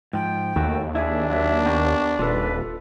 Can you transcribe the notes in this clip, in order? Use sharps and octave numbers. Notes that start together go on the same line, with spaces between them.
G#2 F3 G5
D#2 A3 F#4
D4 E4 F4 G#4 E5
F#3 E5
B3 G4 A#4 C#6
D#1 F4 A4 B4